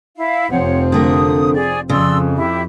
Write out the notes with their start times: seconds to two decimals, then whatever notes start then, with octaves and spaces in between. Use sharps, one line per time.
0.16 E4 F5
0.51 F1 F3 C4 C#5 F#5
0.92 D3 A3 A#4 D#6
1.54 G#4 D5
1.89 F2 C#3 D5 C6 E6
2.36 E4 G4